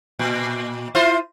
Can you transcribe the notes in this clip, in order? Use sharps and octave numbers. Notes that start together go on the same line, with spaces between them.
A#2
E4 F4 C5